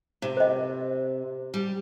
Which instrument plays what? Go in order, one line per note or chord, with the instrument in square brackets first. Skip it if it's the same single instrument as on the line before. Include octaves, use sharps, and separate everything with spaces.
[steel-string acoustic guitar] C3
[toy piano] C5 D#5
[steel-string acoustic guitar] G3